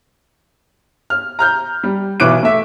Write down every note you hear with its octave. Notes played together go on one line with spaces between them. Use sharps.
F6
A#5 F6 G6
G3
B1 B2 E3 D6 F#6 D7
A3 E5